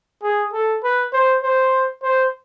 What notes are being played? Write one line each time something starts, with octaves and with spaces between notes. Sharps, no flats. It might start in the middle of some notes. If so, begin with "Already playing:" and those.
G#4
A4
B4
C5
C5
C5